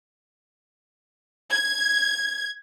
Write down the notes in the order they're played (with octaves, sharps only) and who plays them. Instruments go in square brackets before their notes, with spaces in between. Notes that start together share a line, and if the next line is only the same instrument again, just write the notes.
[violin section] G#6